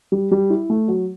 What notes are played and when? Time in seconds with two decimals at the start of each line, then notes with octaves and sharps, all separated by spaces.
0.12 G3
0.31 G3
0.50 E4
0.70 A3
0.88 F#3